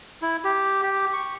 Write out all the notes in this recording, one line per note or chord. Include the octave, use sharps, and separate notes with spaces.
E4
G4
G4
C#6